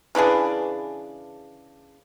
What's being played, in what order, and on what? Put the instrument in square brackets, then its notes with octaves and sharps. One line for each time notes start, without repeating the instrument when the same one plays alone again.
[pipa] C#3 E3 D4 G#4